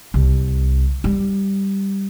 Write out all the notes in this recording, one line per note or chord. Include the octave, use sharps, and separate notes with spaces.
C2
G3